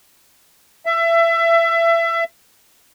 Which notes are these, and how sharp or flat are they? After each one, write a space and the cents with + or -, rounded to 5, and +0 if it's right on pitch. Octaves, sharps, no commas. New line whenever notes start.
E5 +25